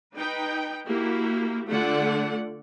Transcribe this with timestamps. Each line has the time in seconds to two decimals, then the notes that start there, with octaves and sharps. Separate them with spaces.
0.16 D#4 B4 G5
0.87 A#3 E4 F#4 G4
1.69 D3 A3 F4 D5 F#5